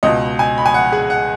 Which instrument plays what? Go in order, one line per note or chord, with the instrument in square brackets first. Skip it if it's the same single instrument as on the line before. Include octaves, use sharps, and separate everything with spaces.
[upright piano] C#2 B2 D#5
G#5
B5
G#5
F#5
G#4
F#5